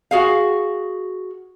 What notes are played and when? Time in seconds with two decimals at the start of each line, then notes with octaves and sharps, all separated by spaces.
0.11 F#4 G#4 F5